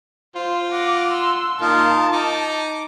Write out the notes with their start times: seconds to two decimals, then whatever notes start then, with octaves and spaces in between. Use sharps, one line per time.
0.35 F4 C5
0.72 F#5 D6 A#6
1.11 C6 E6
1.61 A#2 D#4 F4 A#4 A5
2.12 D#4 D6